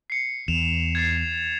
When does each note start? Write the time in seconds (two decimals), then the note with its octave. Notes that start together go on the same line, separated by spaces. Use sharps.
0.10 C7 C#7
0.48 E2 E7 F7
0.95 G#6 A6 C7